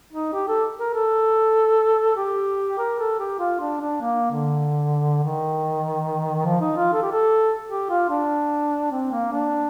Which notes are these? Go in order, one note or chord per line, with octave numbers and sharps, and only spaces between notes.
D#4
G4
A4
A#4
A4
G4
A#4
A4
G4
F4
D4
D4
A#3
D3
D#3
F3
D#4
F4
A4
G4
A4
G4
F4
D4
C4
A#3
D4